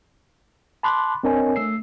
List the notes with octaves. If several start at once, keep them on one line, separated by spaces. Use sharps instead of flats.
A5 B5 C6 D6 F#6
C4 D4 A#4 C#5 D#5 G#5
A3 E6 C7